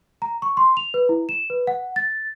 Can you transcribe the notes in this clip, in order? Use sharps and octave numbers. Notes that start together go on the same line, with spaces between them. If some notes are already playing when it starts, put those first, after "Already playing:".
A#5
C#6
C6
F7
B4
E4
E7
B4
F#5
A6